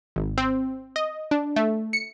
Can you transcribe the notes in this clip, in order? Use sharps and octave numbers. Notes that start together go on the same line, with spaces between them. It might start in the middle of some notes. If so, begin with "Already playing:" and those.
G#1
C4
D#5
D4
A3
C#7